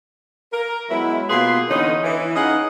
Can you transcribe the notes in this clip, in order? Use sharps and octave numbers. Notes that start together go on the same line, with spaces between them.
A#4
F#3 G#3 B3 E4
B2 A#3 F4 G#4 B4 C6
D3 E3 B3 C#4 D#4
E3
C#4 D#4 G#4 D#5 F5 F#5